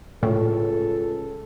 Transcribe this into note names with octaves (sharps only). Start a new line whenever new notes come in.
C#2 A2 A4